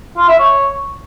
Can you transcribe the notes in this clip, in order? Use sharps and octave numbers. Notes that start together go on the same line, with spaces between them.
F4
E5
C#5